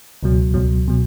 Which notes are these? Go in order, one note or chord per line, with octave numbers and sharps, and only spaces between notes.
C#2 B2 F#3
C#2 B2 F#3
B2 F#3